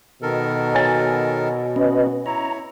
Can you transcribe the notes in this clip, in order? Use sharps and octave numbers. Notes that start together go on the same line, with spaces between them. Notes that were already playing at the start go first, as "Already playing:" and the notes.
B2 D#3 A4 A#4
C#5 G#5 A6
C#4 B4 D#5
E4 C#5 A#5